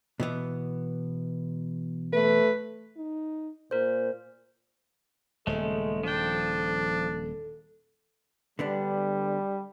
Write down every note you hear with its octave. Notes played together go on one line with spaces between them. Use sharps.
B2 E3 B3
A3 B4
D#4
A#2 A#4 C5
D#1 C#3 G#3 A3 A4
F3 D4 G5
D3 G3 B3 D4